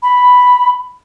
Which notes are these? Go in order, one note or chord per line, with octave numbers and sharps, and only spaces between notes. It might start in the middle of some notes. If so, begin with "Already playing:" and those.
B5